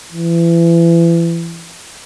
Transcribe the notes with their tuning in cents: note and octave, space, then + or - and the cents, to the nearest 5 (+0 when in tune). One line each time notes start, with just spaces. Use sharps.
E3 +35